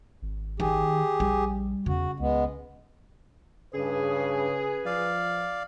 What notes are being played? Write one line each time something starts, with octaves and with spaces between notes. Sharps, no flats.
G#1
D#3 G4 G#4
A#1 G3
E2 C#3 F#4
C#2 G#3 B3
G2 C#3 G#4 B4
F3 D5 F5